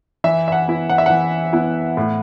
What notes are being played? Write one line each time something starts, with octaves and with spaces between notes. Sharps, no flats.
E3 E5
E5
F#5
B3 E4
F#5
E5
E3 F#5
B3 E4
A2